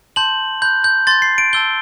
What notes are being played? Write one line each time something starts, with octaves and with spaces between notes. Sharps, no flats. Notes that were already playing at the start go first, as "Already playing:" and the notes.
A5 C6 G6 F#7
B5 F#6 G6
G6
C6 G6 A6
C7
D7
A5 E6 G6 G7